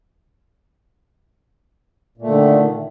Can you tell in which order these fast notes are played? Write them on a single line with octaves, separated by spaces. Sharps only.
A#2 A3 D3 D#3